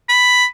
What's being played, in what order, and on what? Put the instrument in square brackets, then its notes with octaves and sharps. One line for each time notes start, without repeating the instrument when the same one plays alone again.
[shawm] B5